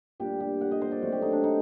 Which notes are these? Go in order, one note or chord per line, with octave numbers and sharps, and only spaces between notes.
A#2 G3 D4 G4
G4
F#5
D#5
C5
D5
D3 F#3 A3 C4 F#5
G4
D#4
D4
D#4